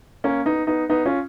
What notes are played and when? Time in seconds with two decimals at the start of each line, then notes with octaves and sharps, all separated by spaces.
0.24 A#3 C#4
0.46 B3 D#4
0.67 B3 D#4
0.89 B3 D#4
1.05 C#4 F4